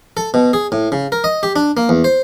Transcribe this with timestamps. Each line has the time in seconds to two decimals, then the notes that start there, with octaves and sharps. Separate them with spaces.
0.17 A4
0.34 B2
0.53 G#4
0.72 A2
0.92 C#3
1.12 A#4
1.24 D#5
1.43 G4
1.56 D4
1.77 A#3
1.89 E2
2.04 C5